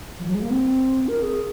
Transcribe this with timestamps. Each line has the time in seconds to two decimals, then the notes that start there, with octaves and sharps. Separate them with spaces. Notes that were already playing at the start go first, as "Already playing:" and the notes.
0.19 F3
0.27 F#3
0.34 G#3
0.42 A#3
0.50 C4
1.08 A#4
1.23 G#4